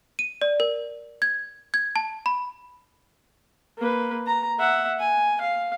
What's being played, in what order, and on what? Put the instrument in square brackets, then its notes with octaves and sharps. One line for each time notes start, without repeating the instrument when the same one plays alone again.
[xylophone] D#7
D5
A#4
G#6
G#6
A5
B5
[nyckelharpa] A#3 B4
A#5
E5 F#5
G#5
F5